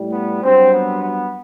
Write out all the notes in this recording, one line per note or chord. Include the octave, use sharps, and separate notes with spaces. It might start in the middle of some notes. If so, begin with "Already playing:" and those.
Already playing: A2 G3
B3
G2 F#3 C4
B3
B3